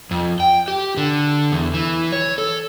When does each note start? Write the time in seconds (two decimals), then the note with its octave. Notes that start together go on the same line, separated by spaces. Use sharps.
0.11 F2
0.40 G5
0.68 G4
0.97 D3
1.52 E2
1.74 E3
2.12 C#5
2.38 A4